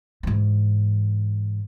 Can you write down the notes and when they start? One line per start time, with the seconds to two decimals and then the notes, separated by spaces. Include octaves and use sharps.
0.23 G#2 E3